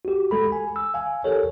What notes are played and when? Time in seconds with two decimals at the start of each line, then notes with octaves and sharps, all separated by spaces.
0.05 F#4 G4
0.31 G#3 A4 B5
0.52 G#5
0.76 E6
0.94 F5 G#5
1.24 G4 A4 A#4 C#5